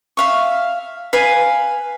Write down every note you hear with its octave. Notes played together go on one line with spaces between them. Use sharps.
E5 F5 C#6
B4 F5 G#5